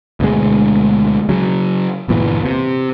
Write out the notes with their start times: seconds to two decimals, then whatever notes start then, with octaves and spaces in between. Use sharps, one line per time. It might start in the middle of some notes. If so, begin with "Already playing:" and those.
0.20 D2 B2 G#3
1.29 C#3 F#3
2.08 G1 E2 A#2 E3
2.45 C3